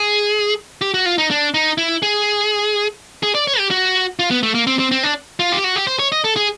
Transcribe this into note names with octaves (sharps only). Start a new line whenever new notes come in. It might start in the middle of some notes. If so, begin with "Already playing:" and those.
Already playing: G#4
G4
F#4
F4
D#4
D4
D#4
E4
G#4
G#4
D5
C#5
G4
F#4
F4
B3
A3
A#3
C4
C4
C4
D4
F4
G4
F#4
G4
C5
C#5
D#5
A4
G#4